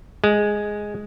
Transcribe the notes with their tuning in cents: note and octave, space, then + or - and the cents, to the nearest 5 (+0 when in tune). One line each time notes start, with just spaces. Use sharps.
G#3 +0